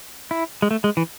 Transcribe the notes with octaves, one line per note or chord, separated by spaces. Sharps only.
E4
G#3
A3
G#3
E3